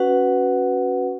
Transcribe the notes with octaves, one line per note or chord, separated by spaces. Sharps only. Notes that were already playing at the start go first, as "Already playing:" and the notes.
Already playing: C#4 F#4 B4 F#5